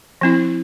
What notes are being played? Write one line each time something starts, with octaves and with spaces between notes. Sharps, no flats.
F3 C4 E4